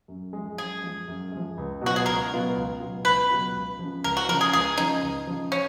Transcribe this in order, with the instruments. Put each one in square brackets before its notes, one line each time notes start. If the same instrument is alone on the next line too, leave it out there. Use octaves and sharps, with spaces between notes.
[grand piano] F#2
F3 G#3
[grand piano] F#2 [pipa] G#4
[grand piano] F3 G#3
F#2
G#3
F3
C#2
[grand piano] B2 F#3 B3 F4 [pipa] F#4
[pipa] G#4
[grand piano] C#2 [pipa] A#4
[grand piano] B2 F#3 B3 F4
C#2
B2 F#3 B3 F4
[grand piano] C#2 [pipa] B4
[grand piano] B2 F#3 B3 F4
C#2
C#3 F3
[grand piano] C#2 [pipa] A#4
[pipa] F#4
[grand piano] C#3 F3 [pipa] A#4
[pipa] G#4
[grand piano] C#2 [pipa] G#4
[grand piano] C#3 F3 [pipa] D#4
[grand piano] C#2
C#3 F3
[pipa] C#4